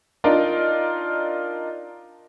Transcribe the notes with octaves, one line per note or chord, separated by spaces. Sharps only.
D4 D#4 F4 A#4